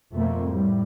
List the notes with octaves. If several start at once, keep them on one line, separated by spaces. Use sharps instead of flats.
F2 B2 A3 A#3 C4
A2 G3